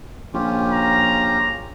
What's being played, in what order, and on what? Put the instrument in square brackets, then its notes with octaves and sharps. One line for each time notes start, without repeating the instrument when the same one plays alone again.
[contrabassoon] A#1 [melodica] C#4 F4 G4
[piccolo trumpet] A#5